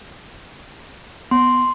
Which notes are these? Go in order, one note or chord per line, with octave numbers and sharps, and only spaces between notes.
B3 C6